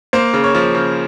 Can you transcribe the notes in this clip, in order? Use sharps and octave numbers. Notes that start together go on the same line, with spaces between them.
A#3 C5
C#3
C#5
F3
C#3